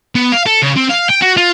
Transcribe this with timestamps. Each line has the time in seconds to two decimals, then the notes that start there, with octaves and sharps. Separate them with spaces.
0.15 B3
0.32 F5
0.46 A4
0.62 C#3
0.76 C4
0.89 F5
1.09 G5
1.22 F#4
1.37 F4